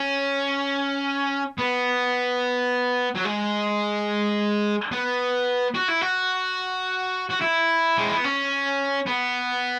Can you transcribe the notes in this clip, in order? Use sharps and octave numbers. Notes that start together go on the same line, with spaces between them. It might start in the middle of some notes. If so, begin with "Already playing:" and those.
Already playing: C#4
B3
F#3
G#3
B3
F#4
E4
F#4
F#4
E4
G#3
B3
C#4
B3